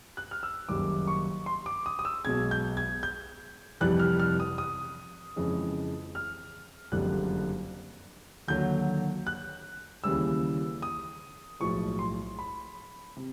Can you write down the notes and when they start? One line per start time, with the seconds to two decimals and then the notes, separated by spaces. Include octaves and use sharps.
0.17 F#6
0.31 F6
0.43 E6
0.69 F#1 F#2 D#3 G3 D6
1.08 C#6
1.46 C6
1.66 D6
1.86 D#6
1.99 D#6
2.05 E6
2.24 B1 B2 G#3 G#6
2.51 G6
2.77 G#6
3.03 G6
3.80 F1 F2 C3 E3 G3 F#6
3.99 F6
4.20 F6
4.40 D#6
4.58 D#6
5.36 F2 C#3 E3 G#3
6.15 F6
6.92 F#1 F2 D3 G3 F#6
8.48 D#2 D3 F#3 G6
9.27 F#6
10.04 D#2 C#3 E3 G3 E6
10.82 D#6
11.60 B1 A2 F3 G#3 C#6
11.99 C6
12.39 B5
13.17 C3